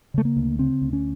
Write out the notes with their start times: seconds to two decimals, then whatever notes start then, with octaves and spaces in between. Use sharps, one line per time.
0.14 C#3 A3
0.25 A#3
0.36 D2
0.59 C#3 C4
0.82 D2
0.93 C#4